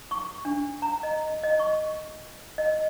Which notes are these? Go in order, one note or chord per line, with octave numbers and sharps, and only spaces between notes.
C#6
D4
A#5
D#5
D#5
C#6
D#5